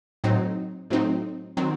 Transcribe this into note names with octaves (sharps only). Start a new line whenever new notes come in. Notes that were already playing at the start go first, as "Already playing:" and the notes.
A2 F#3 C4 D#4
A2 F#3 C4 D#4
D#3 F#3 C4